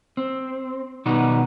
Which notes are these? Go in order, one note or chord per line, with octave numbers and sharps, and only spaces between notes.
C4
B2 D#3 G3 B3 D#4 F#4